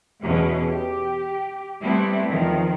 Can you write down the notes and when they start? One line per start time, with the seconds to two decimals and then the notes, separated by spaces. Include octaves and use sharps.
0.21 E2 B2 C#4
0.71 G4
1.82 G3 A3 B3 C4 E4
2.29 E2 D#3 F3